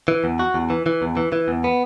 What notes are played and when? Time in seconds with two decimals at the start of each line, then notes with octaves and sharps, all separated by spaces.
0.08 E3
0.24 E2
0.39 F#4
0.54 E2
0.70 E3
0.86 E3
1.02 E2
1.17 E3
1.32 E3
1.48 E2
1.64 B3